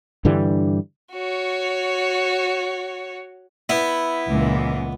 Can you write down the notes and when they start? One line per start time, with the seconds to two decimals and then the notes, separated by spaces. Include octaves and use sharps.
0.25 G2 D3 E3 G3
1.13 F#4 C#5
3.69 B3 E4
4.29 C#2 A#2 E3